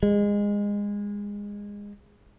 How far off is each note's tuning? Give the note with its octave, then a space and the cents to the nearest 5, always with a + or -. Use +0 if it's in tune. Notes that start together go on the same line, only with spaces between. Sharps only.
G#3 -25